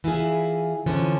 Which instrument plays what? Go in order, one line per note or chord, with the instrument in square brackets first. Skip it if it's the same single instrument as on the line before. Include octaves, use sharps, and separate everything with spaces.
[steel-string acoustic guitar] E3 E4 F4 G#4
D3 E3 F3 C#4